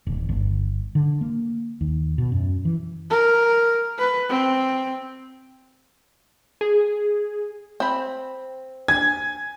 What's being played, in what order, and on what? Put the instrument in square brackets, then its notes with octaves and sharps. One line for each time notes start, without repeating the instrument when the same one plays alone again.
[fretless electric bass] D#1
G1
D3
A#3
D#2
B2
F#2
E3
[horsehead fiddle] A#4
B4
C4
[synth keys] G#4
[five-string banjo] C4 B5
[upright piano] G#5 [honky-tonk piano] G#6